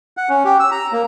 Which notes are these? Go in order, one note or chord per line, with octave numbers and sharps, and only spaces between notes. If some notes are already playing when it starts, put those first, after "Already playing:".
F#5
C#4
G4
E6
A#5
A#3